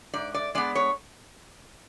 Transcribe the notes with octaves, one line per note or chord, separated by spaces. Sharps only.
G#2 D5
D5
G#3 B3 D5
C#5